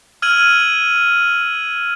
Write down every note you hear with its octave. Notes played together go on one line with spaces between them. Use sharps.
E6 F6 G#6 D#7 F#7